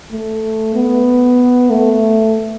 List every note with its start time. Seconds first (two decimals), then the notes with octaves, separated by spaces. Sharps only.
0.12 A3
0.75 B3
1.70 A3